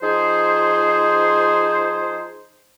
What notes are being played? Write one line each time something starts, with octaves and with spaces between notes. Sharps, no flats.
F3 D#4 G#4 C5